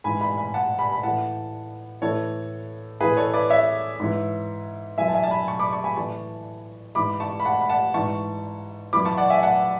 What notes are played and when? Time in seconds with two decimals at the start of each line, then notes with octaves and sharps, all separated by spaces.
0.04 G#2 E3 G#5 B5
0.21 G#5 B5
0.37 G#5 B5
0.54 F#5 A5
0.78 G#5 B5
0.92 B5
1.03 A2 E3 F#5 A5
2.02 A2 E3 A4 C#5
3.00 A2 E3 G#4 B4
3.17 A4 C#5
3.34 B4 D5
3.50 C#5 E5
4.00 G#2 E3
4.98 F#2 E3 E5 G#5
5.08 A5
5.15 E5 G#5
5.23 A5
5.31 G#5 B5
5.48 A5 C#6
5.59 B5 D6
5.73 A5 C#6
5.84 G#5 B5
5.96 A2 E3 A5 C#6
6.95 G#2 E3 B5 D6
7.20 A5 C#6
7.40 B5
7.45 F#5 A5
7.61 B5
7.70 F#5 A5
7.94 G#2 E3 A5 C#6
8.93 F#2 E3 B5 D6
9.05 A5 C#6
9.17 D5 F#5
9.30 E5 G#5
9.43 F#5 A5